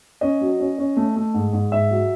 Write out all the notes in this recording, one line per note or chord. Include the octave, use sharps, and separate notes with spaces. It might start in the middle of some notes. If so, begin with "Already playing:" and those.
C#4 D#5
F#3
C#4
C#4
A3
A3
G#2
G#2
G#2 E5
F#3